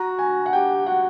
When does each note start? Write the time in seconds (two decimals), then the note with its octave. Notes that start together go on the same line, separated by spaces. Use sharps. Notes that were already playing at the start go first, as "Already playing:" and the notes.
Already playing: F#4 A#5
0.19 G#5
0.46 F#5
0.53 G4 G5
0.86 F#4 F#5